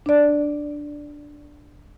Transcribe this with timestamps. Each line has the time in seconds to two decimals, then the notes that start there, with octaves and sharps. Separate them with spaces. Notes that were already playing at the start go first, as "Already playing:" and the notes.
0.06 D4 D5